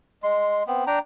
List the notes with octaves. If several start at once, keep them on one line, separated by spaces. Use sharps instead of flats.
G#3 C6
B3 C4
D4 G5 A#5